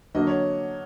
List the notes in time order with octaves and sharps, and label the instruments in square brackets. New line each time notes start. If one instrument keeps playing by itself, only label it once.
[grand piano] D3 F#3 A#3 [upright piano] D#5
[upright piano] C#5